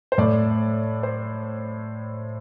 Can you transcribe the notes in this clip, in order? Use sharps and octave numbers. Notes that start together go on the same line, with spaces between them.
C5
A2 A3 D5
C5